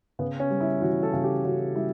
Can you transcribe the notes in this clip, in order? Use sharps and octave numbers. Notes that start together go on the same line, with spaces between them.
C#3 B3
C#4
G3
E4
E3 F#4
A4
C#3
G4
C#3 F#4
G3 E4